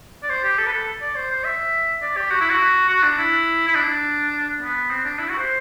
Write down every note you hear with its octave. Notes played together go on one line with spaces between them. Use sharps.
D5
C5
G4
A4
B4
A4
D5
C5
C5
E5
D5
G4
F#4
E4
F#4
F#4
D4
E4
E4
D4
B3
C4
D4
E4
F#4
C5